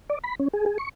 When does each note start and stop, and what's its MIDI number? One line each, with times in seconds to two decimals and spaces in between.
0.10 0.19 74
0.24 0.35 83
0.40 0.48 61
0.53 0.65 68
0.66 0.78 68
0.78 0.89 85